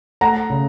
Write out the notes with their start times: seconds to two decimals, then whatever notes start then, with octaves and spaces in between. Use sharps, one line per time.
0.21 A3 F#5 A#5
0.50 C#3